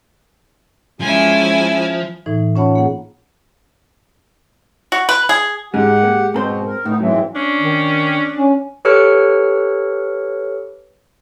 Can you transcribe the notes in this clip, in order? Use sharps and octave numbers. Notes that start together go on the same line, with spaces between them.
F3 G#3 C#4 E4 G#5
A2 E3 D#4
C#4 F4 C#5 F#5 A5 B5
A#3 G#4 F#5
F#4
B4
G#4
G#2 G#3 G4 F#5
A#3
G#2 B2 C4 A4 C5
A#4
A2 B3 D#4
G#2 E3 F#3 C4 E5
C#4 D4
D#3
C#4
G4 A4 B4 C#5 F6 C#7